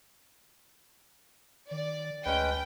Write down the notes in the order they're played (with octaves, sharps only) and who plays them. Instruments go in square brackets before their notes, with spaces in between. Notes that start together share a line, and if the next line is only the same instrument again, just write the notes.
[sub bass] D#3 [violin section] D5
[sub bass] D2 [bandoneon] G#3 C#4 B4 [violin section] G5